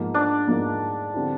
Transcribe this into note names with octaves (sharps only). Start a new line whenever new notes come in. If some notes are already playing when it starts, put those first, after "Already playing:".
Already playing: G#2 F3 A#3
D4
G#2 F3 A#3
D3 G3 C4 E4